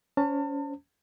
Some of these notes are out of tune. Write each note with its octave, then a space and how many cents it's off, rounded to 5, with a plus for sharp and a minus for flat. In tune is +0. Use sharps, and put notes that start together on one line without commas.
C#4 +30 C5 +0 A5 +35